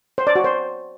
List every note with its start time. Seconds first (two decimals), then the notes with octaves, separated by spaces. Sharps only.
0.18 C5
0.27 D5
0.36 F#4
0.44 C5